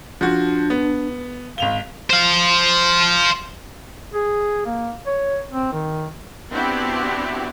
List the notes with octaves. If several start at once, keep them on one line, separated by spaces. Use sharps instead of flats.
F3 D4 F#4
B3
G#1 F5 F7 G7
C5 F5
G#4
A#3
C#5
C4
D#3
B3 C4 D4 E4 F#4 G4